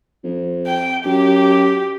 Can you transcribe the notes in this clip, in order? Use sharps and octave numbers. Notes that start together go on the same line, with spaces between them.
F2
G5
F#2 G4